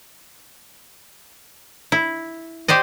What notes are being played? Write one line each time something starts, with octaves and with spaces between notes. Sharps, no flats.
E4
G4 C5 D5 D#5